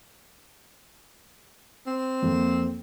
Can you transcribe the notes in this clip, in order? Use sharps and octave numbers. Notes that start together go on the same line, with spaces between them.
C4
F2 A#3